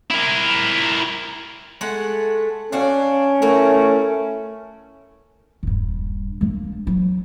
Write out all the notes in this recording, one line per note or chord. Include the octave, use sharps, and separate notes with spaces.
E4 A#4
G#3 A3 F#5
C#4 D4 F#4 F5
A3 E4 F#4 A#4
D#1 G2
A#3 D4
E3 F#3